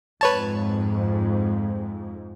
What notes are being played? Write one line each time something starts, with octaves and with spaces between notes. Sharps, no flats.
F2 G#2 B4 C#5 A5